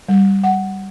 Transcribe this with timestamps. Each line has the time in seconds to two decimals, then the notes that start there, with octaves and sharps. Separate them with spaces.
0.09 G3
0.43 F#5